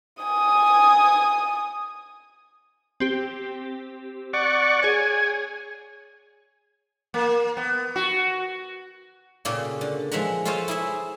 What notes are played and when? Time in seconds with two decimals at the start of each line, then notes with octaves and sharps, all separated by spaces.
0.23 G#5 D#6
3.00 C4 G4
4.33 D5 F#5 C#6
4.83 G#4 C#5 G#5
7.14 A#3
7.57 B3
7.96 F#4
9.45 A#2 C#3 A#3 G4 A4
9.81 D3
10.12 F3 G#3 E5 F#5 A#5
10.45 F4 A4 C5 C#5 D#5 F5
10.68 E4 G#4 E5